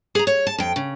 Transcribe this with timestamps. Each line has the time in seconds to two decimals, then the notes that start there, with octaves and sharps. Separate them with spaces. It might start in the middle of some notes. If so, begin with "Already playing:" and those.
0.15 G#4 A#5
0.27 C#5
0.47 A5
0.58 F2 G5
0.76 C#3